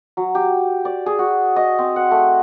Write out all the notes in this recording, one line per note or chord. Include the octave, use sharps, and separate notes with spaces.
F#3
G4
D5
G#4
F#4
D#5
C4
F#5
A3